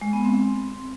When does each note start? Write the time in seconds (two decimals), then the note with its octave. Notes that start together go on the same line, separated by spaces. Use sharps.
0.01 G#3
0.13 B3
0.25 C4